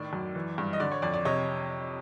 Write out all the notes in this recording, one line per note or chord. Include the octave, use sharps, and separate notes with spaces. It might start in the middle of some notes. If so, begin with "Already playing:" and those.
Already playing: A2 D#3 D5
F#2
E3
G2
D#5
D3 D5
C#5
F2 D5
D5
C3 C#5 D#5